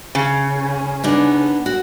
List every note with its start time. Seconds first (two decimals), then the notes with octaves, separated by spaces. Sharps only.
0.15 C#3
1.04 B3 D4 D#4
1.66 F#4